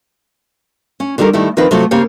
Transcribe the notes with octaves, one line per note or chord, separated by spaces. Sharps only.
C#4
D3 D#3 G3 A4 A#4
D#3 G3 A3 E4
D#3 F3 C4 D#4 A#4 B4
C3 F#3 A3 F4
C#3 A#3 C4 G4 C#5